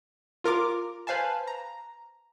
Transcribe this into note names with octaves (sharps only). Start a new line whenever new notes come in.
F4 A#4 A#5 D6
B4 C5 F5 G#5 A5
A#5